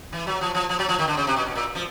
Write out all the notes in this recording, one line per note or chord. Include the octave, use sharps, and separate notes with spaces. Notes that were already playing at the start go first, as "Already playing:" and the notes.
E3
F#3
F3
F3
F3
F#3
F3
D#3
D3
C#3
C3
B2
B2
A#2
F3